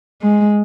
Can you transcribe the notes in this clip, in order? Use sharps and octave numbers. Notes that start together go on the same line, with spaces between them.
G#3